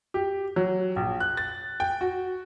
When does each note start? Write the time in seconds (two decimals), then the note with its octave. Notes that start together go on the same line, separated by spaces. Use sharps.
0.14 G4
0.56 F#3
0.96 A#1
1.20 F#6
1.37 A6
1.80 G5
2.01 F#4